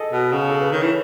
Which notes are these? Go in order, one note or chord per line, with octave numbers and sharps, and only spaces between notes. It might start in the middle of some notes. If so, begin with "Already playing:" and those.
Already playing: G#4 A4 D#5
B2
C#3
A4
B4
D#3 C#5
E3